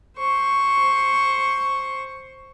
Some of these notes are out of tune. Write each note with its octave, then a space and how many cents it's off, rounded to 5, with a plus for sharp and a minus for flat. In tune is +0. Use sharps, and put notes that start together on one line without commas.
C5 +10 C#6 +0